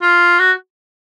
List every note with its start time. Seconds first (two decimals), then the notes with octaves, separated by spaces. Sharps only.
0.02 F4
0.40 F#4